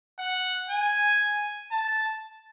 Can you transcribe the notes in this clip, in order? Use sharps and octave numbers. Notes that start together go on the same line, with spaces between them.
F#5
G#5
A5